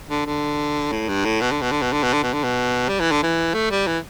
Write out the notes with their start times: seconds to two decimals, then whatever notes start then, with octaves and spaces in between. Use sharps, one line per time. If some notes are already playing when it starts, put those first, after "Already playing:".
0.10 D3
0.26 D3
0.92 A2
1.09 G2
1.25 A2
1.41 B2
1.51 D3
1.62 B2
1.72 D3
1.82 B2
1.92 D3
2.03 B2
2.13 D3
2.23 B2
2.33 D3
2.44 B2
2.89 G3
3.00 E3
3.11 D3
3.23 E3
3.54 A3
3.71 G3
3.87 E3